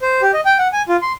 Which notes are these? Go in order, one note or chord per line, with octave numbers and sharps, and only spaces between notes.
C5
G4
D#5
G5
F#5
G#5
F4
C6